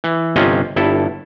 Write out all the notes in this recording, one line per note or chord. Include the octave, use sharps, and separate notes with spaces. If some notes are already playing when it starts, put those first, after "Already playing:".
E3
G1 C3 C#4 F4 D#5
G1 G2 E4 A4